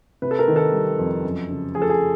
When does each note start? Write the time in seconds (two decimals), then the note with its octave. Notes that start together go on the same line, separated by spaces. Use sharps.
0.22 C3 B4
0.31 A4
0.39 A#4
0.48 D#3
0.56 A4
0.73 G3
0.99 F2
1.24 F#2
1.50 C#3
1.75 F3 G#4
1.82 A4
1.90 G#4